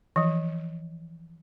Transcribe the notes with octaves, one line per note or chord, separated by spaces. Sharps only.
E3 F3